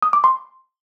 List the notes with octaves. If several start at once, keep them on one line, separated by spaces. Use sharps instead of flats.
D#6
D6
C6